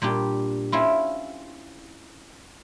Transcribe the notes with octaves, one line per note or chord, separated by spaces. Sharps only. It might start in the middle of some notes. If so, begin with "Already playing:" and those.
A#2 G3 D4 G4
C4 C#4 E4 F4